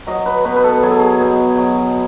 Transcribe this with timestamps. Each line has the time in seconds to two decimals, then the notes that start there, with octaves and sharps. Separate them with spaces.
0.07 F#3 D#5
0.26 B4
0.45 B2 B4
0.56 B4
0.64 A4
0.83 F#3 G#4
0.91 A4
0.99 G#4
1.20 B2
1.57 F#3